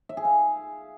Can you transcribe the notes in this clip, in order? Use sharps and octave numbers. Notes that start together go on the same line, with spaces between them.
E5
G#4
F5